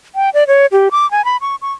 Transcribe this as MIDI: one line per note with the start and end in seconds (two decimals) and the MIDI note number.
0.15 0.30 79
0.34 0.47 74
0.47 0.66 73
0.72 0.89 67
0.91 1.10 86
1.11 1.24 80
1.25 1.37 83
1.41 1.56 85
1.62 1.72 85